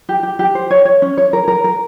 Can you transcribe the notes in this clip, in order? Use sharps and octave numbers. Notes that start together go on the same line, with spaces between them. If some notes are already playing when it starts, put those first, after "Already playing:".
G4
G4
G4
C5
C#5
C#5
C#4
C#5
A#4
A#4
A#4